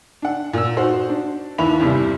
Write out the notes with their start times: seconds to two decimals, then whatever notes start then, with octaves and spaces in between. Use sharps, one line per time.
0.22 D4 F#5
0.53 A#2 E6
0.77 D#4 F#4 C5
1.10 D4
1.58 D#2 E3 E5 B5 F7
1.80 E2 G2 C3 G3 E4